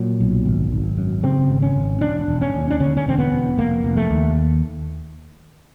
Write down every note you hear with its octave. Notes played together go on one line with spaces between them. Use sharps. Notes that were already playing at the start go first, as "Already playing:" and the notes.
Already playing: A#2 F#3
B1
G#1
G#1
F#2
C#3 C4
G#1
C#4
G#1
E1 D4
E1
C#4
D#2
D4
D3 C#4
C#4
E1 C4
B3
E1
F1 A#3
F1
A3
D#2